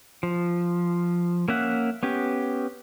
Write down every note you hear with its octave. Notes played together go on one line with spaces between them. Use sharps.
F3
A#3 C#4 E5 F#5
B3 C#4 G4